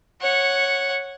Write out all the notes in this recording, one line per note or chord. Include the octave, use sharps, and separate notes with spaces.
C#5 F#5